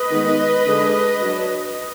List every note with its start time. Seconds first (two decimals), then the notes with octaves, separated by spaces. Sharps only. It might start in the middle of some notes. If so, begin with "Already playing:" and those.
Already playing: B4 D#5
0.11 D#3 G#3 B3
0.67 D3 G#3 D4
1.22 F#3 D4